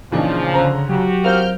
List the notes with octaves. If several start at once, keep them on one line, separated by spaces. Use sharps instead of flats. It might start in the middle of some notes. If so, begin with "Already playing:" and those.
A#2 C#3 E3 F3 D4 D#4
D3 C#4 C5 A#5
F#3 F#4 G4
C4 F4 A#4 F6 G6